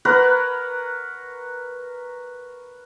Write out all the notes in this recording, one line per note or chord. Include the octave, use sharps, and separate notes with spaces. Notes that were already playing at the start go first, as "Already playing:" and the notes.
A#4 B4 C#5 F#5